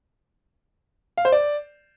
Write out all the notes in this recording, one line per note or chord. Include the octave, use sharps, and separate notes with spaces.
F5
C5
D5